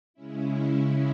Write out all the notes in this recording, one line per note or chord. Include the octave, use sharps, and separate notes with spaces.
C#3 G#3 C#4 E4